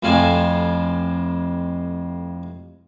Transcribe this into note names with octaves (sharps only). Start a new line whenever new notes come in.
F2 A2 C3 F5 G#5 A5